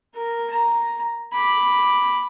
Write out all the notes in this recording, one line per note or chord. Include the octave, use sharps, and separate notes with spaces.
A#4
A#5
B5 D6